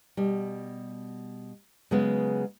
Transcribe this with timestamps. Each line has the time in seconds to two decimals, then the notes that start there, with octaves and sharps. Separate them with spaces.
0.17 B2 G3
1.91 C#3 F#3 G#3 B3